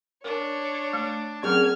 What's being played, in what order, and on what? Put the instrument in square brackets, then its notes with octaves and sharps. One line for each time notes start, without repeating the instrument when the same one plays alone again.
[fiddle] D4 [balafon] A#4 [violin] C#5
[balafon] A3
[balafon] F#3 C4 F#5 [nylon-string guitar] C#4 G#4 A#4 [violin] F6 G#6